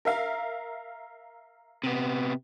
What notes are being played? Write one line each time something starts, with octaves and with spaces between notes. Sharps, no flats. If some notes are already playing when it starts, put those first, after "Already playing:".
A#4 E5 F5
C3 B3